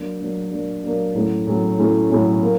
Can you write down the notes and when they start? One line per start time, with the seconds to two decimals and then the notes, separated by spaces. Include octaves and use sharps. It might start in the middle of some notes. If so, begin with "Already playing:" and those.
Already playing: F#3 A#3 D4
0.20 F#3 A#3 D4
0.51 F#3 A#3 D4
0.84 F#3 A#3 D4
1.14 A2 F#3 A3 C#4 E4
1.47 A2 F#3 A3 C#4 E4
1.78 A2 F#3 A3 C#4 E4
2.10 A2 F#3 A3 C#4 E4
2.42 F#3 A#3